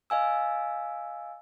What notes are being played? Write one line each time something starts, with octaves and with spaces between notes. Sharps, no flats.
D#5 F5 G#5 E6